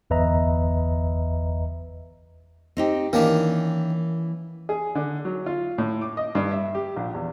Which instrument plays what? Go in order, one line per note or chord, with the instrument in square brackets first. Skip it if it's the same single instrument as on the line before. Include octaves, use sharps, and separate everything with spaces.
[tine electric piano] G1 E2 B4 D#5 E5 A#5
[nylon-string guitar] C4 D#4 G4
[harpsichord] D#3 A#3 D4 [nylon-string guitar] E3 C#4
[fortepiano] G#4
D3
F#3
F4
A2
D6
D#5
G2
E5
G4
A#1
E2